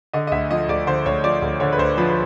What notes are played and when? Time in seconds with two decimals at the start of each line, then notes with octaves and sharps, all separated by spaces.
0.13 D3 D#5
0.27 D#5
0.32 D2 E5
0.51 F3 D#5
0.68 D2 D5
0.87 D3 C5
1.06 D2 C#5
1.24 F3 D5
1.42 D2
1.60 D3 C#5
1.72 B4
1.78 D2 C5
1.98 F3 B4
2.09 B4